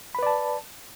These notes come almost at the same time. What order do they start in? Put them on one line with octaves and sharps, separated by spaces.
B5 B4 D5 A5